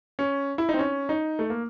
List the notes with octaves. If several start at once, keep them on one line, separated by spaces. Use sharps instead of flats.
C#4
E4
D#4
C4
C#4
D#4
A3
A#3